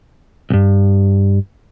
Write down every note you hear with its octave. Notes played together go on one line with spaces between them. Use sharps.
B1 G2